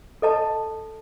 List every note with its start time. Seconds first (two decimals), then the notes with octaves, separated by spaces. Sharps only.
0.22 A4 D#5 A5